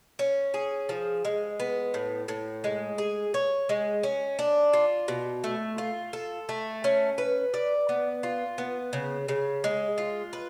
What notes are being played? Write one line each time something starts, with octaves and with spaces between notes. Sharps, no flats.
C#4
G#4
F3
G#3
B3
A2
A2
G#3
G#4
C#5
G#3
C#4
D4
F4
B2
A3
F4
A4
A3
C#4
B4
D5
B3
F4
B3
C#3
C#3
G#3
F4
B4